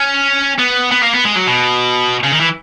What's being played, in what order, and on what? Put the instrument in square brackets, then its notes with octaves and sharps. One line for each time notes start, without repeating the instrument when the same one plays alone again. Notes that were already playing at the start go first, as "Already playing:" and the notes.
Already playing: [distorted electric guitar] C#4
B3
B3
A#3
B3
G#3
F#3
B2
C#3
D#3
E3